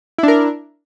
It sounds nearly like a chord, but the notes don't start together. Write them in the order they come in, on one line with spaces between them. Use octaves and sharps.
E4 D4 A#4